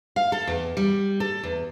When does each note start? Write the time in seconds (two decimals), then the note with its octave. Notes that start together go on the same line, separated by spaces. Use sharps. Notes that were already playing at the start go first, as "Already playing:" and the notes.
0.16 F5
0.32 A4
0.47 E2
0.77 G3
1.20 A4
1.43 E2